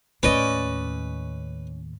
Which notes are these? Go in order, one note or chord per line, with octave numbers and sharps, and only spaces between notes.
D#2 A2 C#4 B4 D5 D#5